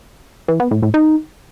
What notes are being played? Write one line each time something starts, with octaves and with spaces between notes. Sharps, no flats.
E3
B3
A2
A2
D#4